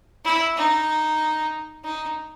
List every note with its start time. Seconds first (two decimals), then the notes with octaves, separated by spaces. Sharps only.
0.25 E4
0.57 D#4
1.84 D#4